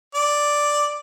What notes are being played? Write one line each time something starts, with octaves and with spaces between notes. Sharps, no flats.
D5